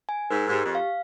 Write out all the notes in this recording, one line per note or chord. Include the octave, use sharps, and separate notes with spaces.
G#5
G#2 A#4
G#2
G4
F2
F5